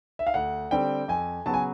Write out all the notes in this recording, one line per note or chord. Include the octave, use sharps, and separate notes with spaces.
E5
F5
D2 F#5
D3 G3 C4 G5
F2 G#5
C#3 F#3 B3 A5
G#5